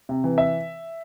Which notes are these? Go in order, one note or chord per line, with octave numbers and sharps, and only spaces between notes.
C3
E3
E5